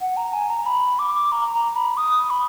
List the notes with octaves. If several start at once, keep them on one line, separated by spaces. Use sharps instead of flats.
F#5
A#5
G#5
A#5
B5
D6
A#5
A#5
B5
D#6
B5